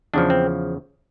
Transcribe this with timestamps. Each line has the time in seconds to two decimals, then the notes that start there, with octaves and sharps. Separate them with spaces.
0.13 E2 C#3 F3 D4
0.30 C4